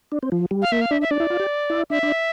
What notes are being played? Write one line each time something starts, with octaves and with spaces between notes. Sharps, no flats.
D4
C4
F3
G3
F5
A#3 E5
F5
D4 E5
E5
D4 D5
E4
F4
G4
E4
D4 E5
D4